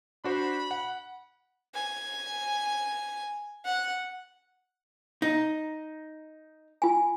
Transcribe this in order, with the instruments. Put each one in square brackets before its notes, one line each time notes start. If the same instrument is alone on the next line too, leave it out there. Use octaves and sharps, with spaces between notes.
[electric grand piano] D4 F#4 C5 [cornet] B5
[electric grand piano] F#5
[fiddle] G#5
F#5
[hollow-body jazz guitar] D#4
[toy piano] F4 G#5